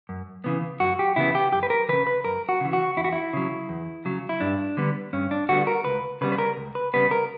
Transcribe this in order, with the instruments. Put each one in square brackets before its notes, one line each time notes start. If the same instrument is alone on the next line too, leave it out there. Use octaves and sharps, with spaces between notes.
[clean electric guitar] F#2
C#3 E3 B3
F#2 F#4
G4
C#3 E3 B3 E4
G4
F#2 G4
B4
A#4
C#3 E3 B4
B4
F#2 A#4
F#4
C#3 E3
F#4
E2 E4
F#4
E4
C#3 F#3
E2
C#3 F#3
E4
G2 D4
D3 G3 B3
G2 C#4
D4
D3 G3 B3 F#4
A#4
C#2 B4
C#3 G3 B3 B4
B4
A#4
C#2
B4
C#3 G3 B3 B4
A#4